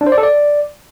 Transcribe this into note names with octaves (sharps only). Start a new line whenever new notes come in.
D4
C5
D5
A4
D5